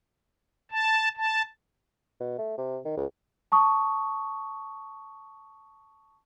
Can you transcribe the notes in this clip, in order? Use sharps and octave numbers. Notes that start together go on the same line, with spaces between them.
A5
A5
B2
A3
C3
D#3
C#2
A5 C#6 D#6